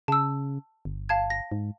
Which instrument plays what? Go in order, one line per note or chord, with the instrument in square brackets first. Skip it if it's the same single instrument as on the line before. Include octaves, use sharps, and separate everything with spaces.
[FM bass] C#3 [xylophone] A5 E6
[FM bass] G1
[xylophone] F5 A5 G#6
A#6
[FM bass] G#2